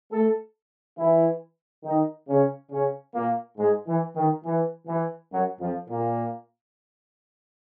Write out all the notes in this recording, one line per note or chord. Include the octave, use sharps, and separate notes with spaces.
A3 A4
E3 E4
D#3 D#4
C#3 C#4
C#3 C#4
A#2 A#3
G#2 G#3
E3
D#3
E3
E3
F#2 F#3
F2 F3
A#2 A#3